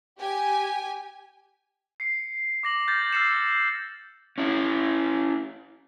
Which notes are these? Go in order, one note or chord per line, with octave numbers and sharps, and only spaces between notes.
G4 G#5
C7 C#7
D6 A#6 F#7
F6 G6 A6
E6 F6 A6 C7 C#7 E7
C#4 E4